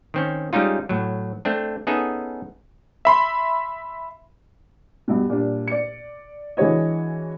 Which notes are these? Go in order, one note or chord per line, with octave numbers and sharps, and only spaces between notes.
D#3 C4 C#4
G3 G#3 C#4 D#4 F4
A2 F#3
A3 C4 D4
B3 C#4 D#4 G#4 A4 E5
E5 B5 C6
G2 B2
A#2 G3 D4
D5 C#7
E3 G#3 D4 F#4 C#5 D#5